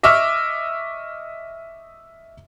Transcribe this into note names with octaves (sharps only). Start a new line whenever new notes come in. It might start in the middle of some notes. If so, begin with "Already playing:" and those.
D#5 E5 C#6 D6 E6 F6